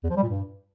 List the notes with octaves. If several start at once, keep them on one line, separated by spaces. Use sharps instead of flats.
E2
F3
G3
A#2
G2